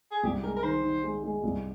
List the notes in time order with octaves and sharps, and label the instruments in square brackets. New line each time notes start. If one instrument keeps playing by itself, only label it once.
[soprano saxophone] G#4
[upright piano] C2 [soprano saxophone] G4
[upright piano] G#3 [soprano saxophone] A#4
[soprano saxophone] A#4
[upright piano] D#3 [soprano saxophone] C5
[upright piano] D#3
G#3
G#3
C2